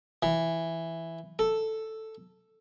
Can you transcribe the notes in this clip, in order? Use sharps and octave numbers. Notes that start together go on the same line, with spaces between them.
E3
A4